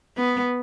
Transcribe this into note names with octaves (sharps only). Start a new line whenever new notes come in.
B3